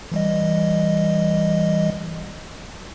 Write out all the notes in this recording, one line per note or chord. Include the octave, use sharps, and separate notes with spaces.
E3 G3 D#5